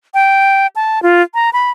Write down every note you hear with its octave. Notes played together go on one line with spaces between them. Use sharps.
G5
A5
F4
A#5
B5